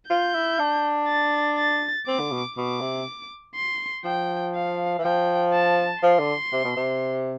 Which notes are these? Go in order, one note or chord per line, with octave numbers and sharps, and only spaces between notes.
F4 G6
E4
D4
A6
A6
C4 D6
D3
B2
B2 D6
C3
C6
F3 G5
F5
E3
F3 G5
A5
F3 C6
D3
C3
B2
C3